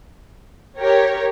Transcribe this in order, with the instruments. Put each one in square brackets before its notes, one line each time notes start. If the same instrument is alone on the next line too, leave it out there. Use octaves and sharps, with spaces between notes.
[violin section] G4 A#4 C#5